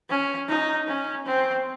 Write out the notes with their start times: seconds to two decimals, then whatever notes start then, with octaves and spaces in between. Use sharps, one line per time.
0.09 C#4
0.48 D#4
0.87 C#4
1.26 C4